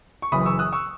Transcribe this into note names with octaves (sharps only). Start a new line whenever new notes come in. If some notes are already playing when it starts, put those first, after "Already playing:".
C#6
F#1 F#2 E3 B5 D#6
C#6 E6
D#6 F#6
C#6 E6